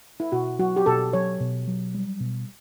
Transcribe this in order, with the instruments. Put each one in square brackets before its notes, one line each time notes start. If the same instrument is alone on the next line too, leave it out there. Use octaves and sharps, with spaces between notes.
[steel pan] E4
[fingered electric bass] B2 [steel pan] F#4
[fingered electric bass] F#3 [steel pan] F#4
[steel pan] G4
[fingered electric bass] B2 [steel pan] A4
[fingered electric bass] F#3 [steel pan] C#5
[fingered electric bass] B2
F#3
G3
B2